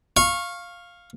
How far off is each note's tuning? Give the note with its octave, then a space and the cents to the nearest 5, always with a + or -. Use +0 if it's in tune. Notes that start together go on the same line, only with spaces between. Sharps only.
F5 +0 C#6 -20